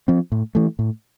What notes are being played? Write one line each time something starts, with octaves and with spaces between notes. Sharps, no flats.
F3 C4
A2
E3 A3
A2